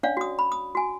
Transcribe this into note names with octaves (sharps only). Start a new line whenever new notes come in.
C#4 D4 C#5 D5 F5
F#4 D#6
B5
D#6
F#4 G#5